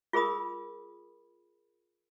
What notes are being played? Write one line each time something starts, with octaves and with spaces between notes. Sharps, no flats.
F4 G#4 A#4 B5 D#6